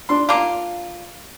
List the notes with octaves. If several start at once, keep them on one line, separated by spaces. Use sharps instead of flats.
D4 C6
A#3 D4 F4 D6